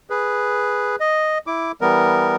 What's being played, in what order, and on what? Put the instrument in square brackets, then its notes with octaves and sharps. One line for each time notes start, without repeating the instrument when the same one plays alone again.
[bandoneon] G#4 B4
D#5
E4 D6
E3 G3 B3 A#4